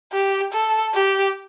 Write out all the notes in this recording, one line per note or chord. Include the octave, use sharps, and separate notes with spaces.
G4
A4
G4